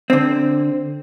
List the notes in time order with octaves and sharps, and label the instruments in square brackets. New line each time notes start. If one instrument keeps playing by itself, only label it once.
[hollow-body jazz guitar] D3 C4